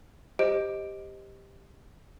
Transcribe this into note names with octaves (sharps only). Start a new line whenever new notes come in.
G4 C5 D#5 D7